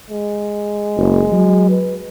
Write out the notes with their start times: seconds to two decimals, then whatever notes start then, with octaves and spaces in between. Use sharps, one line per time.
0.10 G#3
0.98 F#1
1.32 F#3
1.69 B4